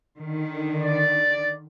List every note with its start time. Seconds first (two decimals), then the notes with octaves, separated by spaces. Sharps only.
0.19 D3 D#3
0.82 D5